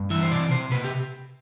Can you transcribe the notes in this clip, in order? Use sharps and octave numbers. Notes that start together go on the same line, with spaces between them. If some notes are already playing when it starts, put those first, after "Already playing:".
Already playing: G2
E3 E5
C5
C3 D5
C3 C5
C3 B4
G4